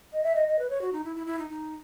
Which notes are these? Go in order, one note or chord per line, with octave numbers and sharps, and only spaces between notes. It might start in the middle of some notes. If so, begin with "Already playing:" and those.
D#5
E5
D#5
D#5
B4
C#5
F#4
D#4
E4
E4
E4
D#4
D#4